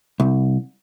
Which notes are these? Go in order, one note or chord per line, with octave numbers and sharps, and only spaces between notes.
C2